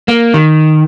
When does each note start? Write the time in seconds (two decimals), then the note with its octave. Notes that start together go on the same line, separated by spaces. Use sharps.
0.08 A#3
0.34 D#3